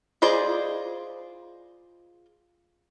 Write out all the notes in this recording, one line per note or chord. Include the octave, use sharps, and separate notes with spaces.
F4 G#4 C5 D5 D#5